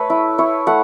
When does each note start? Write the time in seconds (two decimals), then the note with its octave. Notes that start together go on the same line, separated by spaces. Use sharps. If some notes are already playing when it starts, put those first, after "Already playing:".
Already playing: A3 B4 C#5
0.10 E4
0.38 E4 C#5
0.67 A3 F#5